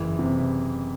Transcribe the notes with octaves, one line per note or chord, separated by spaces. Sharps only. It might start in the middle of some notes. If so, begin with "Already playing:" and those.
Already playing: F#1 E3
C3